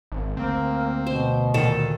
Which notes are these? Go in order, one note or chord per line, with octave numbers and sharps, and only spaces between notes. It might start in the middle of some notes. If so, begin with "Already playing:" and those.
G#1
D2 A#3 C4
B2 C5
A#2 D#3 A4